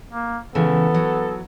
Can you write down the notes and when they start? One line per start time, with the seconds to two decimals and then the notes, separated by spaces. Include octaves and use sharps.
0.10 A#3
0.55 C#3 E3 G#3 B3 A4
0.94 F#3